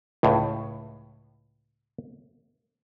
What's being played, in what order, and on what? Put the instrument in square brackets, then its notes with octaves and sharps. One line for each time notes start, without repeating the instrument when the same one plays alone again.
[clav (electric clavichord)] C#2 A2